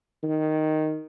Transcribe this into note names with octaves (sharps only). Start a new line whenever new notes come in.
D#3